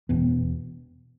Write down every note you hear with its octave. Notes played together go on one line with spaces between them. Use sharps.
E1 E2 B2 B3